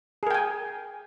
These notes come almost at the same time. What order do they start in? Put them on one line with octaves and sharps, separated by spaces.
G#4 A#4 G5 G#5